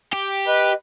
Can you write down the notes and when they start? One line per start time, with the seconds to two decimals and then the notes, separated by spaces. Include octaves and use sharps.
0.13 G4
0.47 B4 D#5